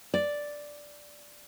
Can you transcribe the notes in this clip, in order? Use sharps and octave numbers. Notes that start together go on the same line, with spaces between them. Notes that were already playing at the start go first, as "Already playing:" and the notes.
D5